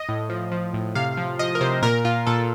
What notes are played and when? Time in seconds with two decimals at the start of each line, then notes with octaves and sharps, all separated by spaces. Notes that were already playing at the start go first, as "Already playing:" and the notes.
Already playing: D#5
0.09 A2
0.30 F3
0.52 F3
0.74 A2
0.95 C3 F5
1.17 F3
1.39 F3 D#5
1.55 A#4
1.61 C3 C5
1.82 A#2 A#4
2.05 A#2 F4
2.27 A#2 A4